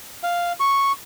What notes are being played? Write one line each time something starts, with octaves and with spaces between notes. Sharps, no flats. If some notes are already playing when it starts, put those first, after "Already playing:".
F5
C#6